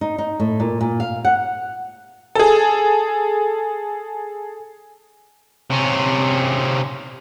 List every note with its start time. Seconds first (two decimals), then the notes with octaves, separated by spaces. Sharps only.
0.01 D#4
0.18 D#4
0.40 A2
0.60 A#2
0.81 A#2
1.00 F5
1.25 F#5
2.35 G#4 A4
5.70 C3 C#4